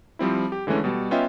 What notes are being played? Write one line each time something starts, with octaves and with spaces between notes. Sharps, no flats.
F3 G3 C4 E4
G4
D3 E3 G#3 A3 C#4
B2 G3
B3 C#4 F4 D#5 E5 G5